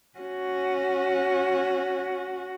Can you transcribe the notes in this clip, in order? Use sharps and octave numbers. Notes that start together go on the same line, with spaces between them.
C#4 F#4